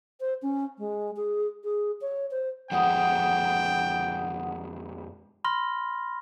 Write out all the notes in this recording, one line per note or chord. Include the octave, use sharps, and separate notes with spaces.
C5
C#4
G#3
G#4
G#4
C#5
C5
F2 G#3 B3 F#5 G5 D#6
B5 C6 F6 A#6